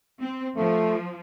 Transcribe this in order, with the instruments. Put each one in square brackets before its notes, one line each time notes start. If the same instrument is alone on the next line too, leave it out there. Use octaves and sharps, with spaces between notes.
[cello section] C4
[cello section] F3 [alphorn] A3